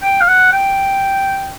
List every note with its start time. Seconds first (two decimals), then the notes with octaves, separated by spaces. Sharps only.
0.03 G5
0.21 F5
0.28 F#5
0.52 G5